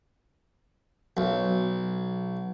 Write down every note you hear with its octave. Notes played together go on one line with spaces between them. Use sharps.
B1